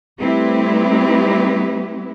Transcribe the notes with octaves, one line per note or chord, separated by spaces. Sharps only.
G3 A3 C4 E4 G4 B4